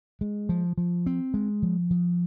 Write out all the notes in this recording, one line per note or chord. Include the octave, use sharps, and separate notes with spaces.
G#3
F3
F3
C4
G#3
F3
F3